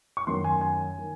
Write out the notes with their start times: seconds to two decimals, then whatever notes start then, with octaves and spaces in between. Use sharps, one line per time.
0.17 C#6
0.27 F#2 D#3 A3 C6
0.44 G#5
0.61 G#5
0.99 D#3